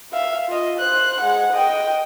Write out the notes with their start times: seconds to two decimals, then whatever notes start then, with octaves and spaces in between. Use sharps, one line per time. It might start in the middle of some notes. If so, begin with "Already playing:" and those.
0.13 E5 F5
0.48 F4 D#5
0.78 C5 F#6
1.21 G#3 F#5
1.53 D#5 G5